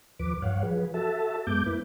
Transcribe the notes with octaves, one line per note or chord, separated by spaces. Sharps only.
D#2 F3 B4 D6
G2 C#5 F5 F#5
F3 G#4 B4
F#4 A4 E5 A5
F#2 G#3 B3 D6 G6
A#3 E4 B4